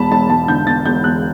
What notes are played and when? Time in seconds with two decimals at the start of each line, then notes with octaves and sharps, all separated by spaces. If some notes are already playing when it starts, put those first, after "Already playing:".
Already playing: E1 E2 A5 B5
0.11 E1 A5
0.30 E1 A5
0.48 D3 G6
0.67 D3 A6
0.85 E1 G6
1.04 E2 F#6